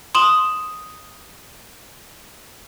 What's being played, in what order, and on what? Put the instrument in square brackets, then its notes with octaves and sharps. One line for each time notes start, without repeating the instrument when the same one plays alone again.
[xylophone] C6 D#6 E7 F#7